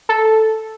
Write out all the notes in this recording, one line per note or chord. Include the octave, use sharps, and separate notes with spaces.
A4